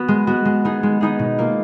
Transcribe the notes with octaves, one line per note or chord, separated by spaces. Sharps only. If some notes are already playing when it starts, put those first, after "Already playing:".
Already playing: B3 F#4
G#3
B3 F#4
G#3
B3 D#4 G#4
G#3
B3 D#4 G#4
B2
A#3 F4